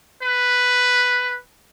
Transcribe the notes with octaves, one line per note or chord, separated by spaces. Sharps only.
B4